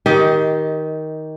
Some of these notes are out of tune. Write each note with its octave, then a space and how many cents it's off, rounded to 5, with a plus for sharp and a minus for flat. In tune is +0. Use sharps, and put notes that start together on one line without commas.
D#3 +10 G4 -10 D#5 +25